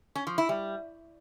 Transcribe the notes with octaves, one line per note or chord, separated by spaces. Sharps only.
C#4
F3
E4
G3